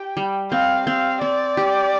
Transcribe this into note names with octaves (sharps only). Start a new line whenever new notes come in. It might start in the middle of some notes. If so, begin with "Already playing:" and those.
Already playing: G4 G5
G3
C4 F5
C4 F5
C4 D5
G4